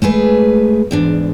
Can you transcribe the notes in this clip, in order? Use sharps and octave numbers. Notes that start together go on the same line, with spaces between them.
G#3 A3 G#4 B4
E2 G#2 D4